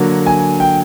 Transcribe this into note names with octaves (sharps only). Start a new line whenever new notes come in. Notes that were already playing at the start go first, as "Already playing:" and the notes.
Already playing: D3 F#3 A#3
G#5
G5